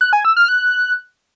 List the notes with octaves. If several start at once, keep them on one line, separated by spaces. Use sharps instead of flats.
F#6
G#5
E6
F6
F#6